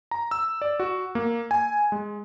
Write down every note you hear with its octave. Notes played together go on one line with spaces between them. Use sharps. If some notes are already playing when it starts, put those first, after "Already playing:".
A#5
E6
D5
F#4
A#3
G#5
G#3